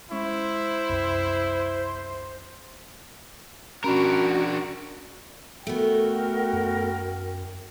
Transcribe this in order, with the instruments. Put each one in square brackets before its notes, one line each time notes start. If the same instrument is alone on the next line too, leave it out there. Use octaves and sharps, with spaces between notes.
[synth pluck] G#3 C#4 C#6 [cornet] E4 [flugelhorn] C5
[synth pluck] C2 F#2 G5
[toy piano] C#4 B5 [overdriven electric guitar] D4 A#4 [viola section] F#4
[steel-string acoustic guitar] A3 B3 [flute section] F#4 A#4 [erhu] G5
[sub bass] F#2